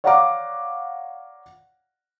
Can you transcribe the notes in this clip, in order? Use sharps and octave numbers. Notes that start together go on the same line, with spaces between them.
C#5 D5 F5 F#5 A#5 D6